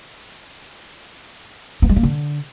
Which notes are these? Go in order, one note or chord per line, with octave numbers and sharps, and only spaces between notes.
B3
G#3
A#3
D3